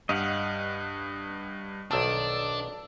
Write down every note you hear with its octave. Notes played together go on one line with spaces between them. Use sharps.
G2 G4 D#5 F5 F#5
B1 D#3 D4 A5 E6